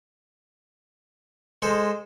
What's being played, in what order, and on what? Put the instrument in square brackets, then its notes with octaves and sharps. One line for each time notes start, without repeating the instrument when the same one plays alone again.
[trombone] G#3 [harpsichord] A4 C5